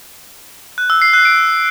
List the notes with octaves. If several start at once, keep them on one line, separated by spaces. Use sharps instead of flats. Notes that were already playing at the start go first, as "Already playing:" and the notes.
F#6
E6
C7
F#6
D7